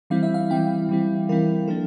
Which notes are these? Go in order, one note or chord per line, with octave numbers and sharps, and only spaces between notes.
E3 G3 C4 E4 F5
E5
F5
E3 G3 C4 E4 G5
E3 G3 C4 E4
E3 G3 C4 E4 A#4
F3 A#3 D4 A4